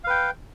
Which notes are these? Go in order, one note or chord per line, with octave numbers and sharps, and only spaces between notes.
B4 F5 G5